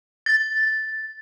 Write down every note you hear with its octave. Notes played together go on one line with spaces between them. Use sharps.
A6